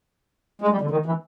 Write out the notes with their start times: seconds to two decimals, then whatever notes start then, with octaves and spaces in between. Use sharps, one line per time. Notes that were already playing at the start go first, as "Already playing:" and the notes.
0.62 G#3
0.71 G3
0.81 D3
0.91 D#3
1.06 E3